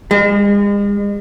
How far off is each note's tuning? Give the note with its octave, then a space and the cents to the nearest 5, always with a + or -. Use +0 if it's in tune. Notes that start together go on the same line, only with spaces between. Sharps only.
G#3 -40